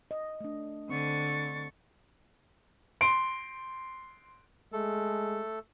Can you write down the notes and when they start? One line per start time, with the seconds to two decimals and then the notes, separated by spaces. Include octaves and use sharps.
0.11 D#5
0.41 A3 D4
0.89 D3 C4 C#6 A6
3.01 C6 D7
4.73 G#3 A3 A4